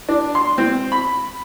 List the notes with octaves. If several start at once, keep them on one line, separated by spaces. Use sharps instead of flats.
D4
C6
C4
B5